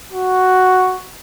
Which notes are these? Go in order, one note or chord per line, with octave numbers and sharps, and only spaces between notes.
F#4